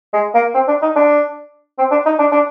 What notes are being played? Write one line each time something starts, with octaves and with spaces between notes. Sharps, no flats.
G#3
A#3
C4
D4
D#4
D4
C4
D4
D#4
D4
D4